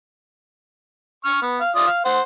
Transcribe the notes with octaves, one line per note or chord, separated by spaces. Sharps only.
C#6 F6
B3
F5
F4 D5 D#6
F5
C5 F#5